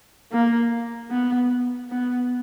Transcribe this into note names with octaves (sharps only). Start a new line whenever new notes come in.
A#3
B3
B3